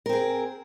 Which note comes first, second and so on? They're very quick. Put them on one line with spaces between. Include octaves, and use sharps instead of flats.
A#4 C4 G#4